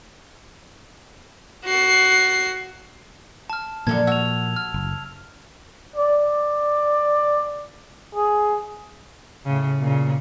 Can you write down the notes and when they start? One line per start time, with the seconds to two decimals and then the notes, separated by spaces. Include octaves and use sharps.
1.65 F#4 C7
3.50 A5 F6
3.87 F#2 A#2 D3 F3 F#3 A#3 A5 G#6
4.07 F#4 E6 F7
4.56 F6
4.74 F#1
5.96 D5
8.15 G#4
9.46 A2 C#3
9.79 A#2 C#3